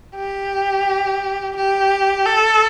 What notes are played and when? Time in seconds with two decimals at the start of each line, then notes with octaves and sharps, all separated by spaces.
0.16 G4
1.56 G4
2.26 A4